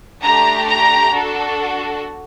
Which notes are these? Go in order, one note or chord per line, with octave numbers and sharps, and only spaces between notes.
A3 D4 G4 A#5
A#5
D4 F#4 A4